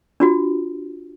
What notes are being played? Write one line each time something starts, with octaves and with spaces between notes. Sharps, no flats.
D4 F4 F#4